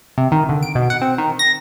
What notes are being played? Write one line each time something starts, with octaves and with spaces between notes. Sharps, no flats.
C3
D#3
D3
D7
B2
F#5
C4
D#3
A#6